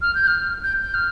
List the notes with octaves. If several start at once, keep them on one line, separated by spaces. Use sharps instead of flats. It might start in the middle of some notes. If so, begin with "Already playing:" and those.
F6
G6
F6
G6
G6
F6